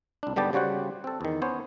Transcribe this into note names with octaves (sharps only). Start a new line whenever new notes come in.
C2 D4
G#2 D3 G3 B3 G4 A5
C#3 G3 F#4 C5 F#5
C4 A4
E2 D#3
B3 C#4 C5 C#5